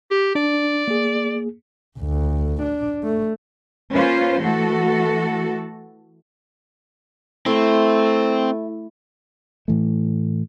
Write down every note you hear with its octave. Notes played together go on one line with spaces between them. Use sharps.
G4
D4 D5
A#3 G#4
D2
D4
A3
A#3 C#4 F4 B4 C5
E3 A3 F#4 A4
A3 C4 E4
A2 E3 A3